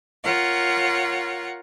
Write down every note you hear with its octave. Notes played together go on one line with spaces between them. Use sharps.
F4 A#4 C#5 F#5